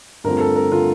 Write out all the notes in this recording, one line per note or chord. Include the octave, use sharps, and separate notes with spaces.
G2 D3 A3 C4 F4 A#4
A4
A#4
D3 A3 C4 F4